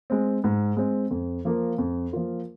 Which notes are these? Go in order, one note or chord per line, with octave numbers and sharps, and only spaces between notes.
G#3 C4
G#2
G#3 C4
F2
F3 A#3 F4 A#4
F2
F3 A#3 F4 A#4